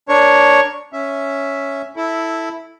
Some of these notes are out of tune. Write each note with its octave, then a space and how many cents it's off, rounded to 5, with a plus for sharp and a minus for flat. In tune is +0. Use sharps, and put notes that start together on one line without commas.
D4 -5 A#4 +0 C#5 +0
C#4 +0 E5 +0
E4 -5 A4 +0